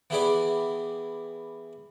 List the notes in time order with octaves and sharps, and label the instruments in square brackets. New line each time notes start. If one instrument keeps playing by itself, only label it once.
[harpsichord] E3 B3 E4 G4 G#4 D5